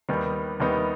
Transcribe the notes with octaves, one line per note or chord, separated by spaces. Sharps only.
D#2 D#3 G3 B3 D#4
D#2 D#3 G3 B3 D#4